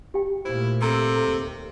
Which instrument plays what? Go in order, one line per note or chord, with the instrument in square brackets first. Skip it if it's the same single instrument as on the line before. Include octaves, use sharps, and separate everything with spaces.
[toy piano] G4 G5
[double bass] A#2 A3 [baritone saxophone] E4 [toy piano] C5
[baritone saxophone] C3 [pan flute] A4 [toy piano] A#5 C6 E6
[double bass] D#2